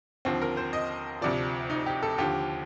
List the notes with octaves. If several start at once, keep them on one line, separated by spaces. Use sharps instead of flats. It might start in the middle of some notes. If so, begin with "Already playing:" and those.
D#2 D3 F3 C4
A#4
C5
D#5
D2 C3 F3 D5
D#4
G4
A4
D#2 D3 F3 G4